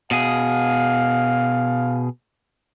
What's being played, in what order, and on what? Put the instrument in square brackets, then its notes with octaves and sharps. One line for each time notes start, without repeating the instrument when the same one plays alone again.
[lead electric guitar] B2 G#4 [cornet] F5